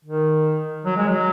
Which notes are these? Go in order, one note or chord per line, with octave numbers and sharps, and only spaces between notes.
D#3
F#3
G#3
F#3